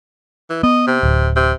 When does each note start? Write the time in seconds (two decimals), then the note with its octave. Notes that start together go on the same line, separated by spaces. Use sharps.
0.50 E3
0.63 B3 D#5
0.87 C3
1.03 D1
1.36 C3